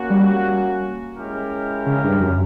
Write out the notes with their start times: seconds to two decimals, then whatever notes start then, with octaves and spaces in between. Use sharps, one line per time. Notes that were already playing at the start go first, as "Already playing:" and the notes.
Already playing: A#3 C#4 F#4
0.10 G3
1.16 G#3 C#4 E4 G4 A#4
1.86 C#3
2.04 G2
2.20 F#2